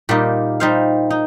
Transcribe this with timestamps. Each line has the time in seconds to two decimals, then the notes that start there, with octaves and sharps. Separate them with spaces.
0.09 A#2 G3 A#3 D#4 G4
0.60 G3 D#4 C5 F5
1.11 D#4